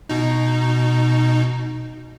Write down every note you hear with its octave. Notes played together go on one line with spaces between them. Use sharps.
B2 D#4